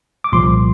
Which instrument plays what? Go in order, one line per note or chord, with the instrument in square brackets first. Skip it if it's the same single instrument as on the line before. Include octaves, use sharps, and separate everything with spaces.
[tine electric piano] D6
C2 A#2 F3 C6